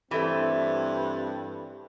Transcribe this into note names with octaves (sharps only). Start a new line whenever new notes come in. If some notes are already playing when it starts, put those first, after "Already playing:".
G2 E3 A3 C4